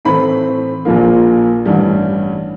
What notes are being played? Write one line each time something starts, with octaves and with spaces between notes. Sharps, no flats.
A2 E3 A3 C4 B5
A#1 A#2 F3 A#3
A1 G2 E3 G3